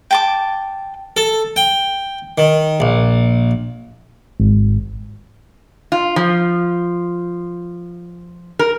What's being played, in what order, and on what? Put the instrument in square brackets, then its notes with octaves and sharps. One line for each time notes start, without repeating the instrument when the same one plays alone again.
[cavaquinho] G5 A5 D6
[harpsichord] A4
G5
D#3
A#1
[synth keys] G#1
[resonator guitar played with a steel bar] F4
F3
A#4